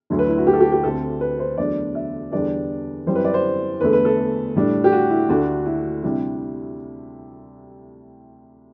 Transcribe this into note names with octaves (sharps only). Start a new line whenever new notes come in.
D2 D3 F#3 A3
B4
E4
F#4
G4
A4
G4
G4
D2 D3 A3 C4 A4
B4
C5
E2 D3 F#3 A3 D4 D5
E5
E2 D3 G3 B3 D4 D5
F#2 E3 G3 C4 C5
B4
D5
C5
E2 D3 A3 B4
B4
A4
A2 G3 D4
G4
F#4
E4
D2 D3 A3 D4 F#4
E4
C3 G3 D4 E4